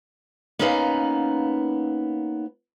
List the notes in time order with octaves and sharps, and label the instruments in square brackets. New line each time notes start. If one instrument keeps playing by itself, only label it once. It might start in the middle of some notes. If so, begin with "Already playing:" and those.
[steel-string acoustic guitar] A#3 B3 C#4 D#4 B4 F5